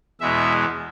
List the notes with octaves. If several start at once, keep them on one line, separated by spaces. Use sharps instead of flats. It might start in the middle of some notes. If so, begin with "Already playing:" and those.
E2 B2 G#3 E5